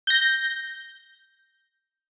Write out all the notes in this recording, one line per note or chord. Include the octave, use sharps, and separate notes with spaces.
G6 A#6